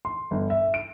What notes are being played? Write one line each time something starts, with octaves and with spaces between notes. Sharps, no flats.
C6
G1
E5
D7